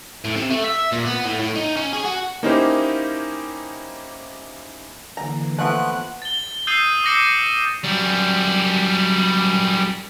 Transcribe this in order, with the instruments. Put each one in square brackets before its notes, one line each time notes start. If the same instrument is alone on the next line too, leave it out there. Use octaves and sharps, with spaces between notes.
[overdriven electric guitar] A2
C3
A3
E5
A#2
B3
A2
A2
D#4
C#4
G#4
F#4
[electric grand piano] A#3 C#4 D#4 E4 G4 C5
[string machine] D3 E3 A#3 [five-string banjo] A#5
[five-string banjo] F3 A3 [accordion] B3 F#6
[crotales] A6 G7
D#6 E6 G6 A6 C7 D#7
D6 E6 A#6 C#7 D#7
[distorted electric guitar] F#2 G3